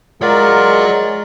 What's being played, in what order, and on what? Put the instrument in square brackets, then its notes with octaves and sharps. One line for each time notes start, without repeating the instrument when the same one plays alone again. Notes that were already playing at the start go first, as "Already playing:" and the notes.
[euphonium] G#3 [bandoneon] F4 A#4 D5 [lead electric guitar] C#5 F#5